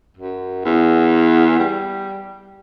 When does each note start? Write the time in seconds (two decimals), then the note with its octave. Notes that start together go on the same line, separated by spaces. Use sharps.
0.17 F#2
0.65 E2
1.59 G3